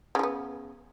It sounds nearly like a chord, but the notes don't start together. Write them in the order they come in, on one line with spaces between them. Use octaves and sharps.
C#3 F3 B3